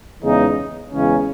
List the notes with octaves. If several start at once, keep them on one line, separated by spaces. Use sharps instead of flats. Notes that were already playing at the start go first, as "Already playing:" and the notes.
E2 C#3 E3 G#3 D#4
E2 C#3 E3 G#3 C#4